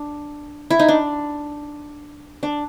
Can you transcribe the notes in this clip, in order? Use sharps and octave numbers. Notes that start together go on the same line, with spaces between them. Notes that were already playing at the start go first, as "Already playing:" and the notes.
Already playing: D4
E4
D#4
D4
D4